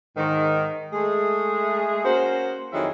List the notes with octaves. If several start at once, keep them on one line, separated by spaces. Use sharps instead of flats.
G#2 D#3
G#3 A3 G#4
A#3 C#4 F#4 C5
F2 D#3 F#3 E4 F#4 G#4